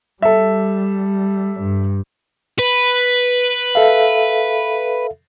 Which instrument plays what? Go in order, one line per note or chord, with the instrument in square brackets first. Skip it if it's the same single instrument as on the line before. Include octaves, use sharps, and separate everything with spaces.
[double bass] G3 [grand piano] A4 E5
[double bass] G2
[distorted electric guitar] B4
[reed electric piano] A4 E5 F5